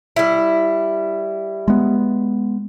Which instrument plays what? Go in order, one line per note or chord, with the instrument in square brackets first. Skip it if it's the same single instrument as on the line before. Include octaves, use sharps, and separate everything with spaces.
[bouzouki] G3 E4
[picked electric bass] G#3 B3